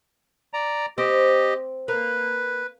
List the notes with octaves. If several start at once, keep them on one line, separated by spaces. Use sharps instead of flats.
D5 A#5
C4 G4 D#5
A#3 B4